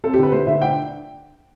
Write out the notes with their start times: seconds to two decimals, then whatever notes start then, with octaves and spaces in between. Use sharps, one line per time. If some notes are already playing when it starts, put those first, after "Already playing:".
0.04 C4 A4
0.14 G4
0.18 D3 B4
0.32 A3 C5
0.47 D3 E5
0.61 D4 G5